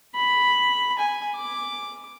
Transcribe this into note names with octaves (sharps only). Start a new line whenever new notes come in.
B5
G#5
D6